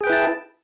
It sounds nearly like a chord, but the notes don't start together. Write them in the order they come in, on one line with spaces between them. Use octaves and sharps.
G#4 G5 B4 E4 A5